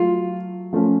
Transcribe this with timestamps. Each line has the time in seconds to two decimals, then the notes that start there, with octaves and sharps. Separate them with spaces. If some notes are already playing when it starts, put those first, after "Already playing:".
Already playing: F#3 A3 F4
0.73 F3 A3 C#4